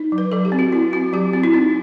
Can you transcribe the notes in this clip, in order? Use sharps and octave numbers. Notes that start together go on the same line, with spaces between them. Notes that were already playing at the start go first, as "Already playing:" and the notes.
Already playing: D#4
F#3
B4
F#3 A4
G4
C4
F#4
C4 E4
C4 F#4
F#3 G4
C4 F#4
E4
C4 D#4